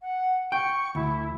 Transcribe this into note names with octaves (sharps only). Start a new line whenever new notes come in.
F#5
G5 C#6
D2 E4